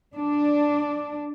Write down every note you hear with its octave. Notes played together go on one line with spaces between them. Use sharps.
D4